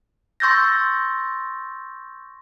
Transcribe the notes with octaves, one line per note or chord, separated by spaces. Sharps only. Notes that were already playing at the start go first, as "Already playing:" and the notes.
C6 C#6 E6 G6 A6 A#6